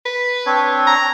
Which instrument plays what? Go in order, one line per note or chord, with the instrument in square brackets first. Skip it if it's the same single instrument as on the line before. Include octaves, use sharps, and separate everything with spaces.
[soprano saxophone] B4
[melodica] C4 D4 C#5
[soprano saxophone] A#5